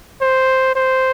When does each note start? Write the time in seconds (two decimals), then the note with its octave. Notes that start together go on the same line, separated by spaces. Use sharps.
0.22 C5
0.76 C5